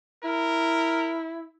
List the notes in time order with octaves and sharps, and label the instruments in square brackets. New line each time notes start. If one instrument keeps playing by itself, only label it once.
[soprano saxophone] E4 [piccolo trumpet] A#4